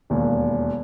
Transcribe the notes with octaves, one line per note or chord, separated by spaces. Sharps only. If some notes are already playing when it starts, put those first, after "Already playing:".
E1 D#2